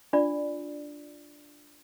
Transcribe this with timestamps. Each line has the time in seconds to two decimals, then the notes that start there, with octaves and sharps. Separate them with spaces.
0.13 D4 F4 D5